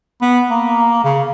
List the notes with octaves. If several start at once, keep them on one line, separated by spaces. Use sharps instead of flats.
B3
A#3
C#3